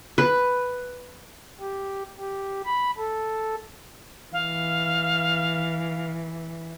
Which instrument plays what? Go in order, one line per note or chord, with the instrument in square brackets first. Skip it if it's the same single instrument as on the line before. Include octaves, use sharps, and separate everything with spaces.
[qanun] B4
[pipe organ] G4
G4
B5
A4
[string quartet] E3 [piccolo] F5